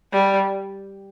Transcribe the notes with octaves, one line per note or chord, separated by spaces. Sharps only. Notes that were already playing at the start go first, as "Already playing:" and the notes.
G3